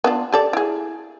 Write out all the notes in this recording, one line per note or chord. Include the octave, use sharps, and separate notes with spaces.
B3 D4 F4
G4 A4 D5
E4 G#4